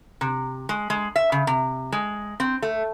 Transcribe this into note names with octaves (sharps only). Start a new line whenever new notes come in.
C3
G#3
G#3
E5
C#3
C3
G#3
C4
A3